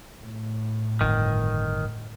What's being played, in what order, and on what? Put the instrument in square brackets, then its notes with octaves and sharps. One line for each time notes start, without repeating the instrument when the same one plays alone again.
[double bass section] A2
[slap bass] G1 F2 [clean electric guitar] D#3